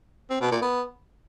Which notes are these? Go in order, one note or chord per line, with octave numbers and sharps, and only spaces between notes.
C4
B2
A#2
B3